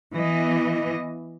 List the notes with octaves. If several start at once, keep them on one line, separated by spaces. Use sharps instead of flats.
E3 B3 D#5